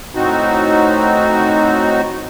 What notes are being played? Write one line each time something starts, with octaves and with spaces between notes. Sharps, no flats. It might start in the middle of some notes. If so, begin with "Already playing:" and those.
A2 C4 D#4 F#4